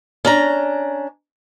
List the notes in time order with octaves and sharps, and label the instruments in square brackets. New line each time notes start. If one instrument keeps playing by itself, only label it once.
[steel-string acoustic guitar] C#4 D4 A#5